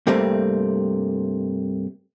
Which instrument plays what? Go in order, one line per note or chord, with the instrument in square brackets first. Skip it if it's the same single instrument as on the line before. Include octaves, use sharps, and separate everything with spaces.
[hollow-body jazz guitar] G2 C3 G3 A3 A#3 C4